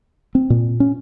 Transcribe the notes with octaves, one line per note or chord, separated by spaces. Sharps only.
C4
A#2
C#4